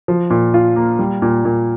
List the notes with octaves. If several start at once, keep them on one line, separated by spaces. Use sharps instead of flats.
F3
A#2
F4
A#3
G3
A#2
A#2